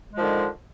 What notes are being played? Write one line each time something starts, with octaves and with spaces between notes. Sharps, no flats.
D3 D#3 F3 G#3